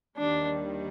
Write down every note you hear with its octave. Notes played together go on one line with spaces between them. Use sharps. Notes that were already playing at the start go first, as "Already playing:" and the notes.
D#2 D#3 G3 D4